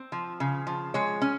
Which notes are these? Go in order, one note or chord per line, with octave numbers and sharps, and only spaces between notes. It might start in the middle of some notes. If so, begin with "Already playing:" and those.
Already playing: C4
F3
C#3
F3
G#3 C#5
C#4